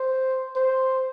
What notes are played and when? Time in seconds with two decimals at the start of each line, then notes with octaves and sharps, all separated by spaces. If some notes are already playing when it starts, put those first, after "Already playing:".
Already playing: C5
0.56 C5